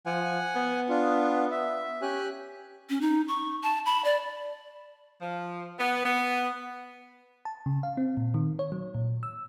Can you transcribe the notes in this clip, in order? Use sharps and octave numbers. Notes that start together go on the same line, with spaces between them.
F3 F#5 G#5
B3
D4 F4
E5
C#4 G4 G#5 F#6
C#4
D#4
C#6
A5
B5
D5
F3
B3
B3
A5
C#3
F5
C4
A#2
D#3
C#5
F#3
A#2
E6